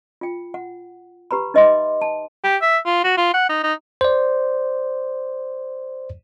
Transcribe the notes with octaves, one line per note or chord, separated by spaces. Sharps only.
F4 G5
F#5
G4 B4 A#5 B5
D#4 B4 D#5 E5 C6 D6
A5
G4
E5
F4
F#4
F4
F#5
D#4
D#4
C5 D5